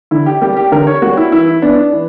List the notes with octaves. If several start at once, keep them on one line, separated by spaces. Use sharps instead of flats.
D3 E4
G4
G3 A#3 G4
G4
D3 A#4
C#5
G3 A#3 F#4
E4
E3 E4
B3 D4
E3